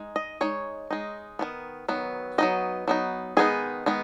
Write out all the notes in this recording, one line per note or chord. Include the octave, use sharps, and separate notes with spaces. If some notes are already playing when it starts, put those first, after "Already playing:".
Already playing: G#3 D#4
D#5
G#3 D#4 C#5
G#3 D#4
D#3 F#3 B3
D#3 F#3 B3
F#3 B3 D#4 D#5
F#3 B3 D#4
D#3 G#3 B3 D#4 G#4
D#3 G#3 B3